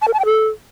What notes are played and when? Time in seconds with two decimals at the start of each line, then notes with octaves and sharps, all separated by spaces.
0.02 A5
0.08 A#4
0.14 A5
0.19 G5
0.25 A4